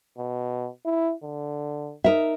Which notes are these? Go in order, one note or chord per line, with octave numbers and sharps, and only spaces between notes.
B2
E4
D3
D#4 A#4 E5